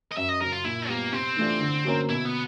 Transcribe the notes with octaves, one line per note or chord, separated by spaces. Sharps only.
D#5
F#2 E5
D#5
C#3 F#3 A#4
F4
A#2 E4
G3 A#3 B3
C3 C4
E3 A3 D4 F4
D3
F#3 A#3 C#4
B2 E4
B3